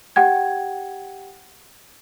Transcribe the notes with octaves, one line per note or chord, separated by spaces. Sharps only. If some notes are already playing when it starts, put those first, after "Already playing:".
G4 F#5 G5 G#6